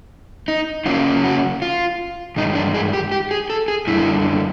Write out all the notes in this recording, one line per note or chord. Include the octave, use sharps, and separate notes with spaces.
D#4
C#3 F#3 A#3 C#4 F4
F#4
F4
G2 D#3 G#3 D#4
D4
G#4
G4
G4
G#4
A4
G#4
F#2 D3 G3 E4